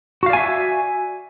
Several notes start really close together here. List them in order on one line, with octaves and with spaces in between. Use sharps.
F#4 F5 D5 G#5 E5